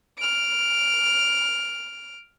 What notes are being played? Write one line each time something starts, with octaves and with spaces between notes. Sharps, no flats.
F6 D7